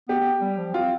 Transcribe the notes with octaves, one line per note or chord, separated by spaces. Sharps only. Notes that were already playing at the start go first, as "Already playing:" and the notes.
B3 G4
B3
G3
F3
C4 F4